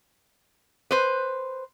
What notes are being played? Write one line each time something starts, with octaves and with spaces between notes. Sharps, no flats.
B4 C5